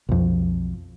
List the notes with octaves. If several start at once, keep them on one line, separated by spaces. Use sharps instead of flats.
B1 F2